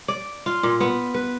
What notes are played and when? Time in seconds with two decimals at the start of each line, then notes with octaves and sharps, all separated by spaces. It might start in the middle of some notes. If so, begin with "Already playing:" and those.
0.08 D5
0.46 F4
0.63 A#2
0.80 B3
1.14 B4